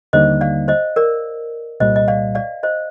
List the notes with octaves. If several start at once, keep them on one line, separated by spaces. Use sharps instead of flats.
D#2 D3 G3 A#3 D#4 C5 D#5
D5 F5
C5 D#5
A#4 D5
C2 A#2 G3 C5 D#5
D#5
D5 F5
D5 F5
C5 D#5